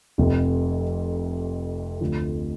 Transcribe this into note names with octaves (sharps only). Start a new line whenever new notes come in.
F1 F2 C3
D2 D3 F3